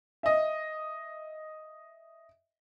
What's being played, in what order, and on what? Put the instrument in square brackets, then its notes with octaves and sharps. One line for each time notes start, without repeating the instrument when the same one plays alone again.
[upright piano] D#5 E5